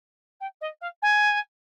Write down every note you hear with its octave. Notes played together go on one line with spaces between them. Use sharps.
G5
D#5
F5
G#5